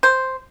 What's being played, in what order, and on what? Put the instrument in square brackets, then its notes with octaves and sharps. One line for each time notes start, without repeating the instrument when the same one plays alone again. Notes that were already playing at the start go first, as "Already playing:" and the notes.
[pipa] C5